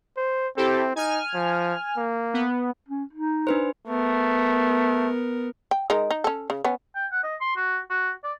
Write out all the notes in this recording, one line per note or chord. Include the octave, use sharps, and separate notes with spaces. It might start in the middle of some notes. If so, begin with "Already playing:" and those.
C5
C4 E4 G4 A4
D#4 G#5 F6
F3
A#3
B3
C#4
D#4
D4 B4 C5
A3 B3 A#4
G5
G#3 D#4 A#4
D#4
C#4 A4
C#3
B3 C#4
G5
F#5
D#5
C6
F#4
F#4
D5